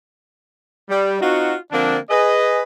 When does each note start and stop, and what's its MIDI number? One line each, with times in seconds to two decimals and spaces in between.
0.89 1.17 55
1.20 1.54 60
1.20 1.54 63
1.20 1.54 65
1.20 1.54 66
1.72 1.96 50
1.72 1.96 53
1.72 1.96 58
1.72 1.96 60
1.72 1.96 62
2.09 2.62 68
2.09 2.62 71
2.09 2.62 75